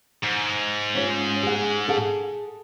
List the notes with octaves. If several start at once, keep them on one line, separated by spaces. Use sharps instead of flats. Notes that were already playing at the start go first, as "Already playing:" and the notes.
G#2
C#4 F4 C#5
G#4 F#5
G#4 A4 F#5